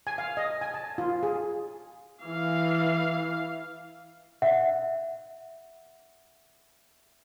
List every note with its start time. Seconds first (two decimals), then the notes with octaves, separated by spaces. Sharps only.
0.07 G#5
0.18 F5
0.37 D#5
0.61 G#5
0.74 A5
0.98 F4
1.23 G#4
2.24 E3 F5
4.42 E5 F#5